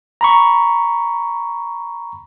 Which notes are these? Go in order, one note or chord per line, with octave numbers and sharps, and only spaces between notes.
A#5 B5 C#6